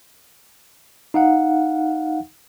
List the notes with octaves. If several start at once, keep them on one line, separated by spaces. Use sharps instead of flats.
D#4 F5 F#5